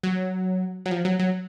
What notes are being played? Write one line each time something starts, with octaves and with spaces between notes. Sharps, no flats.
F#3
F#3
F3
F#3
F#3